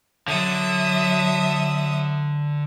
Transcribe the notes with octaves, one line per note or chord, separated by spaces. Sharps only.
D3 F#3 E5 D#6